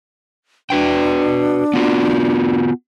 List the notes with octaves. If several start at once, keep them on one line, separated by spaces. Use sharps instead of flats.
D4 F#4 B4 G5
B3 F4 F#4